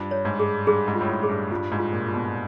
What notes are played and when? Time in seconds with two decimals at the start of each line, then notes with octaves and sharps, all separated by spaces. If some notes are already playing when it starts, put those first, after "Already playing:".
Already playing: G2 F4
0.11 C#5
0.25 G#2
0.40 G#4
0.67 G2 G#4
0.88 G#2
0.95 F4
1.01 A2
1.08 G#2
1.23 G#4
1.29 G2
1.51 G2 F4
1.72 G#2
1.79 F4
1.93 A#2
2.07 F4
2.14 B2